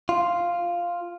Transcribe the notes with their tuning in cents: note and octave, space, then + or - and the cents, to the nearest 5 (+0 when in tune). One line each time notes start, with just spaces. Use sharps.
F4 +0